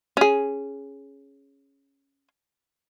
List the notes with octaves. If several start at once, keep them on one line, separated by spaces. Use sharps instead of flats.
C#4 G#4